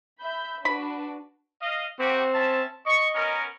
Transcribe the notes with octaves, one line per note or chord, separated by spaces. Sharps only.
E5 B5 G6
D4 F#4 B4 B5
D#5 F5
A#3 C4 F#4 G4
C#4 E5 A5
D#5 C#6
B3 C#4 A#4